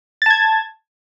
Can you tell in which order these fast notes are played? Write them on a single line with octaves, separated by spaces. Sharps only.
A6 A5 G#6